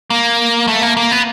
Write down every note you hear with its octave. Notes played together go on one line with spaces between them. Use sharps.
A#3
A3
A#3
A#3
B3